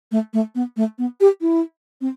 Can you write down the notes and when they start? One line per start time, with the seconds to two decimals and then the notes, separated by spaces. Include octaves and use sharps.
0.12 A3
0.33 A3
0.55 B3
0.77 A3
0.98 B3
1.21 G4
1.41 E4
2.01 C4